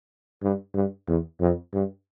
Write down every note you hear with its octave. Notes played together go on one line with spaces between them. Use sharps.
G2
G2
E2
F2
G2